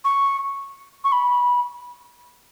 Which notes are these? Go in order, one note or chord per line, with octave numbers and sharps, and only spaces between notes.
C#6
C#6
B5